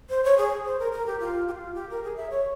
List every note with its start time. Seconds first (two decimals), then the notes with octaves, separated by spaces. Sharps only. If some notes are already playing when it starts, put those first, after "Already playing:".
0.09 C5
0.24 C#5
0.38 G#4
0.65 C5
0.79 A#4
0.92 A#4
1.06 G4
1.20 F4
1.48 G4
1.51 F4
1.75 G4
1.90 A#4
2.03 G#4
2.16 E5
2.30 C#5